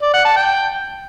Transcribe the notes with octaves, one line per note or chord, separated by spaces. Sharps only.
D5
F#5
A5
G5